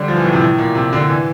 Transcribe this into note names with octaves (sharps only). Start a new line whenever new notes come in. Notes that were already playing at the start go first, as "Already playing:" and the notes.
Already playing: D3 G3
F3
E3
A2
C3
A2
A#2
C3
D3
E3